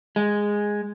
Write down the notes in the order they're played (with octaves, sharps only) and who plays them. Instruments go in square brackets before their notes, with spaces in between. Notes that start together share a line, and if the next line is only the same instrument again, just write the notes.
[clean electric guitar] G#3